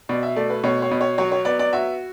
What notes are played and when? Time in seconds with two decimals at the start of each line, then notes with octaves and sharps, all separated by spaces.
0.09 B2 D5
0.23 E5
0.36 A3 D5
0.50 B4
0.64 B2 C#5
0.82 C#5
0.91 B2
1.01 C#5
1.18 F#3 C#5
1.32 C#5
1.45 B3 D5
1.59 D5
1.73 F#4 E5